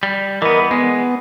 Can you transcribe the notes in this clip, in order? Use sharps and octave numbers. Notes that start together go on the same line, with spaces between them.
G3
E3 B3 A#4 D#5
G#3 B3